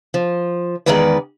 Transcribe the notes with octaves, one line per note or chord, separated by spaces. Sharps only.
F3
E2 A#2 D#3 G#3 B4 D5